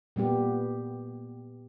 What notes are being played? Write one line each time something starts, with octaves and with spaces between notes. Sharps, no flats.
A#2 G3 B3 G4